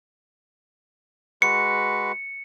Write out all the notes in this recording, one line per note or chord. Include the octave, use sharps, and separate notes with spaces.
G#3 F#4 B4 C#7